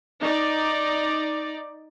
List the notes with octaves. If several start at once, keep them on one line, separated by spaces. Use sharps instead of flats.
D#4 D5